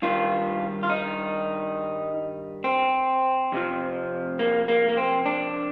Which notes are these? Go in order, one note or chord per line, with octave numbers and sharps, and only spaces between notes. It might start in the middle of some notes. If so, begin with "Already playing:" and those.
G2 D#3 G3 F4
F4
D#4
C4
F2 C3 F3
A#3
A#3
A#3
C4
D4